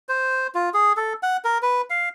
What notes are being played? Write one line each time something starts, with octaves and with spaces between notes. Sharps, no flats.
C5
F4
G#4
A4
F#5
A#4
B4
F5